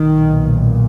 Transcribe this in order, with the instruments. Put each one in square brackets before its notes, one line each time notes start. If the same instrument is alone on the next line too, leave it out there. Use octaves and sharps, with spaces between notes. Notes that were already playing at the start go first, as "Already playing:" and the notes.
Already playing: [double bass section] B1 A#2 D#3